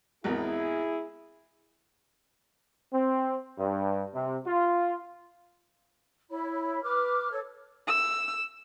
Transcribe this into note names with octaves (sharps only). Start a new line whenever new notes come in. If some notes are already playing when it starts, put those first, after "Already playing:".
G#1 E2 E4 G#4 A#4
C4
G2
C3
F4
E4 C#5 B5
B4 D6 F6
A4 C#5
E6